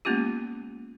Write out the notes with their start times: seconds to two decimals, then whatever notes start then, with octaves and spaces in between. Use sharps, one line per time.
0.05 G#3 A#3 B3 C#4 F4 G4